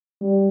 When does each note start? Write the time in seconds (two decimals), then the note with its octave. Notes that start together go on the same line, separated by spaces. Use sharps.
0.21 G3